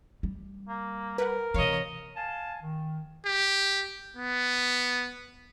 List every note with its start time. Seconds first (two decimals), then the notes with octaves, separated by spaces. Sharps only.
0.23 G3
0.68 A#3
1.18 A#4 B4 F#5
1.54 C3 E3 C#5 D#5 F5
2.16 F5 G#5 A5
2.61 D#3
3.26 G4
4.16 B3